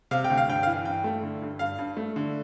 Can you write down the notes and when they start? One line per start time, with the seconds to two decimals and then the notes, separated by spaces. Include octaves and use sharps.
0.11 C3 F5
0.24 G5
0.30 D2
0.37 F5
0.49 G2 G5
0.63 F5
0.67 E3
0.85 G2 G5
1.04 A3
1.23 D3
1.42 G2
1.59 G2 F5
1.78 G2
1.97 A3
2.16 D3